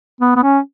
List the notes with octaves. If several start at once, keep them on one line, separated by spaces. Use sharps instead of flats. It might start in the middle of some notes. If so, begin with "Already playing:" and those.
B3
B3
C#4